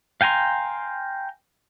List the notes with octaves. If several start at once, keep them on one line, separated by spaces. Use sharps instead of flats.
F5 G5 G#5 A#5 C6